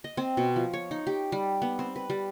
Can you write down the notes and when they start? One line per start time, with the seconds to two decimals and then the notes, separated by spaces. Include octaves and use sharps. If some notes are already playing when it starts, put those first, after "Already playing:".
0.04 D#5
0.17 C4
0.37 B2
0.56 F3
0.73 C#5
0.91 D#4
1.07 G4
1.32 G3
1.62 B3
1.79 C4
1.96 B4
2.10 G3